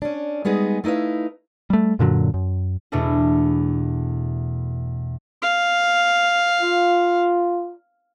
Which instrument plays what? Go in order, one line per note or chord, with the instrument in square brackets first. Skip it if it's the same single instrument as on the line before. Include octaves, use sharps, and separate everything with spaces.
[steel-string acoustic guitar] C#4 D4
G3 G#3 B3 D#4 G#4
A3 D#4 E4 B4 F5
[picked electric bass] G3 A3
F#2 A#2 D3 F#3
F#2
[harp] E2 B2 A3 D4 E4
[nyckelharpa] F5
[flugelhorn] F4